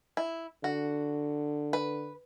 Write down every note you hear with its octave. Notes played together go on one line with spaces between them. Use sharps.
E4
D3 F#4
B4